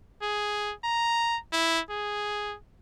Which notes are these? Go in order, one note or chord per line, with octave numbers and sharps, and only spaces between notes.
G#4
A#5
E4
G#4